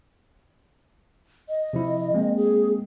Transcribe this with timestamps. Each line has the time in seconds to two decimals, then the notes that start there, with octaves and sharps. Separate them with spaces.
1.49 D#5
1.73 C3 F3 E4
2.14 G#3 A#3 C4
2.37 G#4